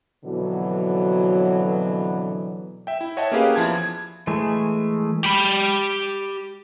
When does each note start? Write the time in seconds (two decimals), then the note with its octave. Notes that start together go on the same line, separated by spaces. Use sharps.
0.25 F2 B2 D3 E3 F#3
2.87 E5 G5
3.01 E4
3.17 C#5 D#5 E5 F#5 G5 A5
3.32 A#3 C#4 G4 G#4 B4 F5
3.56 E2 F3 E4 A5 G#6
3.79 G#6
4.27 E3 G#3 A3
5.25 G4 B5